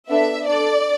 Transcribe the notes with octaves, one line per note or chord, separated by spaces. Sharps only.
B3 D4 A4 E5
D4 A4 D5